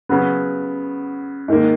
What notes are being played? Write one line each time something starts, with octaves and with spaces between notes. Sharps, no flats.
C#3 F#3 B3
G#2 D#3 A#3